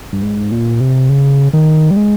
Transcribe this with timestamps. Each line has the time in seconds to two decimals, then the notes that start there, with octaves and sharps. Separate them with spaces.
0.13 G2
0.23 G#2
0.52 A#2
0.80 C3
1.09 C#3
1.53 D#3
1.91 G3
1.97 G#3